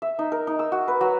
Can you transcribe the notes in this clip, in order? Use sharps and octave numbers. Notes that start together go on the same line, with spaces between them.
E5
D#4
A#4
D#4
E6
F#4
B4
F#3